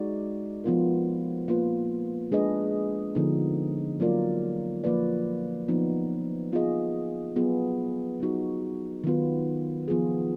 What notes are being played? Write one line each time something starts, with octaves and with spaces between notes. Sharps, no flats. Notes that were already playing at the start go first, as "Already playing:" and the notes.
Already playing: G#3 D#4 F#4 D5
F3 B3 F4 A#4
A#3 F4 B4
G#3 D4 G#4 B4 D#5
D3 F3 B3 D#4
F#3 A#3 F4 A#4 D5
F3 A#3 F4 B4 D5
F3 B3 D#4
B3 F4 G#4 D#5
F#3 B3 F4 G#4
F#3 B3 D#4 F#4
D#3 F#3 B3 F4 B4
F3 B3 F4 G#4